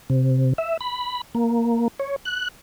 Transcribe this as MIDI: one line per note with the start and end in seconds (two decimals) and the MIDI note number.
0.10 0.53 48
0.58 0.77 76
0.81 1.21 83
1.35 1.88 58
2.00 2.16 73
2.25 2.48 90